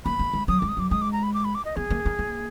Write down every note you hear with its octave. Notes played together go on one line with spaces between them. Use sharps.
A#3 B5
A#3
G#3
F#3 D#6
G#3 D6
D#6
F#3 D6
G#3 D#6
D6
A#5
B5
D6
B5
D6
D#5
B3 G#4
A#3
A#3
A#3